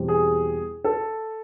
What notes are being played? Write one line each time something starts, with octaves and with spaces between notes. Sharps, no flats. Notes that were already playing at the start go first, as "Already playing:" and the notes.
Already playing: E2 B2 G3 C4
G#4
A4